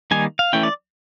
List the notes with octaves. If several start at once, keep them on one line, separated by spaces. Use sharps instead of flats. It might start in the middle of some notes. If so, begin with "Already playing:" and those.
D#3 G3 A#3 D#4 G#5
F5
E3 A3 C#4 E4 G5
D5